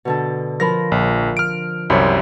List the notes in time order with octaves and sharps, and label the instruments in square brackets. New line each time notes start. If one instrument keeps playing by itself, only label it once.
[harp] B2 D3 A4
[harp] F3 A#4 B5 [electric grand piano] A#6
[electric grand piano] A#1
F6 D7
[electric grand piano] C2 F#2 C3 [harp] C#5 B5